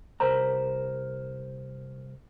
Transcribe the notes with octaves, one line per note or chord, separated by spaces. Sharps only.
C2 A#4 C5 A#5